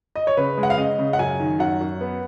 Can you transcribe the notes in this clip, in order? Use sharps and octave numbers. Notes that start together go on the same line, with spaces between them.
D#5
C#5
C#3 B4
G#3
F#5
F5
C#3 D#5
C#3
F#5
F#2 G#5
D#3
F#2 F#5
F#2
B3